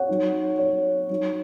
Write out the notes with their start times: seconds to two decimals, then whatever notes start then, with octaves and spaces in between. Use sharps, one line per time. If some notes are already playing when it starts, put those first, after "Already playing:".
Already playing: C#5 F#5
0.09 F#3 D#4
0.59 C#5
1.10 F#3 D#4